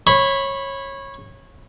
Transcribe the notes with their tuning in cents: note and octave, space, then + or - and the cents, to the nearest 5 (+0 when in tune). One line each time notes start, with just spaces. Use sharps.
C#5 -20 B5 +0